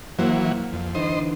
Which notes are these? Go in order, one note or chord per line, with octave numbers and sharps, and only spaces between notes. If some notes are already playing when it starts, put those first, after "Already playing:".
E3 F#3 A#3 C5
F2
D3 E3 D#4 C5 D#5